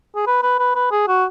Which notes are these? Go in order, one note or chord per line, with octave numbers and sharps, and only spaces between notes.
G#4
B4
B4
B4
B4
G#4
F#4